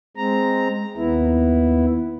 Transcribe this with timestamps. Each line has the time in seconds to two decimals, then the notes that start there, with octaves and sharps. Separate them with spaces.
0.17 G#3 C4 A#5
0.97 D#2 B3 E4